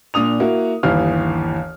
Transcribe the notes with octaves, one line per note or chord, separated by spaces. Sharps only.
A#2 D4 D#6 F7
A#3 E4 F#4
G1 D#2 E3 F5 F6